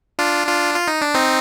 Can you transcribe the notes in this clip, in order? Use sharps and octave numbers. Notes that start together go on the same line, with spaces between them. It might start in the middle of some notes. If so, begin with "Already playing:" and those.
D4 F4
D4 F4
F4
D#4
D4
C4 D#4